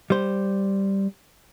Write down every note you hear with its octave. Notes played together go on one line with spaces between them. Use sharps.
G3 C5